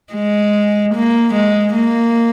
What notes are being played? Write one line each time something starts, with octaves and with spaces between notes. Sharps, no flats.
G#3
A#3
G#3
A#3